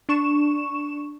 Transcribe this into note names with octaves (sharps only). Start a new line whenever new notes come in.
D4 C#6 E7